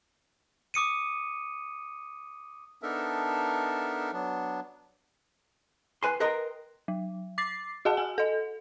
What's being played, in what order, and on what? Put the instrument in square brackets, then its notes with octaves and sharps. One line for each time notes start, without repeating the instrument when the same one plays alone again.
[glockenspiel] D6 D#6 C#7 D#7
[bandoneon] B3 D4 D#4 A4 A#4 E5
F#3 B3 D4
[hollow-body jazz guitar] B4 G#5 C6
A#4 B4 D#5 G5 A#5 C6
[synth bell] F#3
D6 A6 C7
F#4 G#4 D#5 F#5 A5
F#4 G#5
A4 D#5